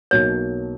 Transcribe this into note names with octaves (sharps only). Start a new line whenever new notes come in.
B1 B2 F#3 A#3 C#5